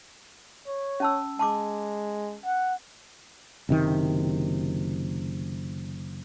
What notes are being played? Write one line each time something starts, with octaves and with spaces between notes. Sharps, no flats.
C#5
C#4 A5 E6
G#3 A5 C6 D6
F#5
F#1 C3 D#3